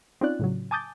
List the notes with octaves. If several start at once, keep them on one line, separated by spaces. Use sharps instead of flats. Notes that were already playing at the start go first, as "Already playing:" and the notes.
C4 C#4 D#4 F4 D5 F#6
A2 C#3 F#3
G#5 A5 D6 D#6 G6 A6